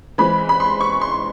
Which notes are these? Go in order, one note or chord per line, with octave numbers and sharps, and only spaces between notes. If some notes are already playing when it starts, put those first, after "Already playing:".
E3 G#3 C4 B5
B5
C6
C#6
C6